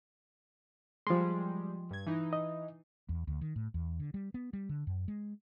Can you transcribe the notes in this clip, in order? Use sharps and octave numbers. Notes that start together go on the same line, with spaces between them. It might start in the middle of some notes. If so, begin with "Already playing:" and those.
F3 G3 G#3 C6
G2 G#6
E3 D#4
D#5
E2
D2
D#3
A2
E2
D3
G3
B3
G3
D3
F#2
G#3